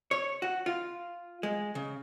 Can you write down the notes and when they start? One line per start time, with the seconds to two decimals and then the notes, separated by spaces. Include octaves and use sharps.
0.11 C#5
0.42 F#4
0.66 F4
1.43 G#3
1.75 C#3